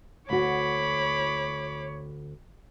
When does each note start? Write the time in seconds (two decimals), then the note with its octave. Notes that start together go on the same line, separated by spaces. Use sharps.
0.30 D2 F#4 C#5 B5 D6